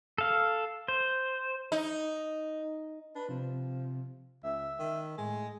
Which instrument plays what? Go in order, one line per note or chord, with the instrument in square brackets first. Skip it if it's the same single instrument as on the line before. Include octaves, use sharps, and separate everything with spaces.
[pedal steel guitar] A4 F5
C5
[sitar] D#4
[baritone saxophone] D4 [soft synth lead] B4
[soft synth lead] C3 [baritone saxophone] F3
[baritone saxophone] C#2 [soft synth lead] E5
[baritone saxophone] D#3
[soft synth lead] A2 [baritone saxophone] G#3